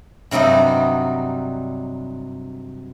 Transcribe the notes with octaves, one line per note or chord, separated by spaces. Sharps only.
G2 C3 F#3 G3 D#4